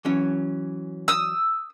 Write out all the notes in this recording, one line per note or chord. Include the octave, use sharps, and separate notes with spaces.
E3 F#3 C#4
D#6 E6